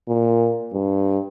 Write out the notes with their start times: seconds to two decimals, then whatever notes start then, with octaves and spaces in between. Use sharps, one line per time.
0.08 A#2
0.73 G2